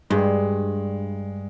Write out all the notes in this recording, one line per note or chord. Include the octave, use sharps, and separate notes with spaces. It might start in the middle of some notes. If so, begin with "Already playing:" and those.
G2 G#3